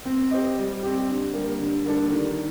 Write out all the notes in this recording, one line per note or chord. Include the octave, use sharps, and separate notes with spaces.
C4
G4 C5 D#5
G3
C4 G4
D3
G3 A#3
D3
G3 A#3 D4 A4
D#3